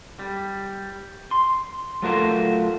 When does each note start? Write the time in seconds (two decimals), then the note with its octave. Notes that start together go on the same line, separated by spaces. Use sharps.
0.19 G3
1.31 C6
2.02 F#3 A3 F4 F#4 A#4 C5